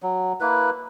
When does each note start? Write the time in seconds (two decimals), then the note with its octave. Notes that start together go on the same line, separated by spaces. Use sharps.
0.03 F#3
0.40 A#3 E4 B4